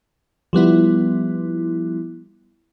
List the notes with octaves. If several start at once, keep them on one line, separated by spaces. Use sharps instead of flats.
F3 G3 B3 E4